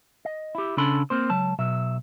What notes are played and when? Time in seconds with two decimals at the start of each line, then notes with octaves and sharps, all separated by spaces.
0.25 D#5
0.55 E4 G4
0.77 C#3 C#4 D4 A4 B5 C6
1.10 A#3 C4 C5
1.30 C#2 F#3 A5
1.59 B1 B2 F#3 E5